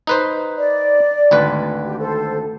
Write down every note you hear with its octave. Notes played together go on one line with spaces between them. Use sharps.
D#4 B4 C5
D5
G#1 D2 B4
G4
A4 C5